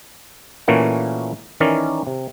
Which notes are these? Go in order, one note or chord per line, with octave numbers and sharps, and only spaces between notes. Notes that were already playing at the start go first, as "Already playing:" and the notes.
A#2 E3 A3 A#3 C#4 F#4
D#3 E3 C#4 A#4 D5
C3